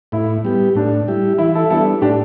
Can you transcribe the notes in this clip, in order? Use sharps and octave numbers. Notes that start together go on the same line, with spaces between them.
A2 E4
G3 B3 G4
A2 D4
G3 E4 G4
E3 E4
E4 A4
G3 B3 D4 E4 A4
A2 D4 G4